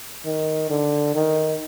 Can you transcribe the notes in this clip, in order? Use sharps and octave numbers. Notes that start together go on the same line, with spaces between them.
D#3
D3
D#3